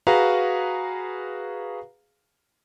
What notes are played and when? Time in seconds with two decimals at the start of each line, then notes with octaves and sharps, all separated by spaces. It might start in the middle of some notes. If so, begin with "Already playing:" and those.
0.07 F#4 G#4 B4 F5 A#5